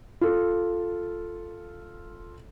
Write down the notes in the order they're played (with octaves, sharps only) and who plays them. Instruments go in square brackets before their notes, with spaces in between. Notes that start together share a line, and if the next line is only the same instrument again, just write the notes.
[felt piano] F4 A4